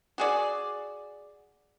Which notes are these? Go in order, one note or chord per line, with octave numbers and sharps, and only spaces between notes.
F#4 G#4 D5